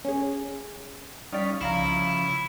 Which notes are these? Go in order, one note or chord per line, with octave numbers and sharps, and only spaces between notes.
C#4 G#4
G3 C#4 D#4 D5 F5 B6
C2 C#3 F3 E4 F5 A#5